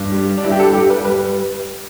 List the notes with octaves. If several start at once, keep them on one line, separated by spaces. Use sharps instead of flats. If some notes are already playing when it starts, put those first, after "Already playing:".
Already playing: G2
G3
D4
G2 E4
G4
A4
G3 G4
B4
G3 B4